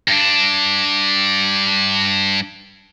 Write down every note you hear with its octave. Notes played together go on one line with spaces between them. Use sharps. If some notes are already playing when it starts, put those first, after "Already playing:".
G2 D4